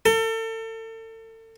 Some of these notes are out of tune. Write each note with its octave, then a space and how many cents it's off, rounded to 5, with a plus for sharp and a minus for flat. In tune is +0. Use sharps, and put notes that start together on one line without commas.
A4 +35